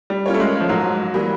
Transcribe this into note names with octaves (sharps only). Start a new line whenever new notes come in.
G3
C#4 F4 A#4 C#5
A3
G#3
F3
G#2 F#3
E3 G3 A#3